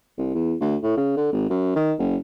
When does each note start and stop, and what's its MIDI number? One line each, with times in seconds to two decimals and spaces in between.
0.18 0.34 36
0.35 0.55 40
0.61 0.76 38
0.83 0.97 45
0.97 1.14 49
1.17 1.33 50
1.33 1.48 32
1.50 1.72 42
1.76 1.93 51
1.99 2.17 30